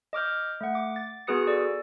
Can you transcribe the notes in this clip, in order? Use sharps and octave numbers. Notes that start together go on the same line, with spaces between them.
D#5 D6 F6 G6
A3 F#5
D6
A6
B3 F#4 G#4 B4 D#6 C#7
A4 D5